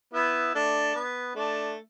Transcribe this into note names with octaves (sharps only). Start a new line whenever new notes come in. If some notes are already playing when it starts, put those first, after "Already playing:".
B3 E4
A3 D4
B3
A3 D4